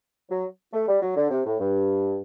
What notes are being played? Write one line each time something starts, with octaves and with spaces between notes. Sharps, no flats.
F#3
A3
G3
F#3
D3
C3
A2
G2